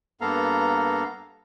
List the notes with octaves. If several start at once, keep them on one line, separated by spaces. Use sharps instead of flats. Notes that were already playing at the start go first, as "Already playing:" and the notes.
G2 A#3 B3 A4 F5 A#5